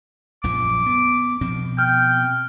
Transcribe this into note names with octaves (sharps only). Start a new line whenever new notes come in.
A#1 F#2 F3 D6
B3
B2 F3 C4
G5 F6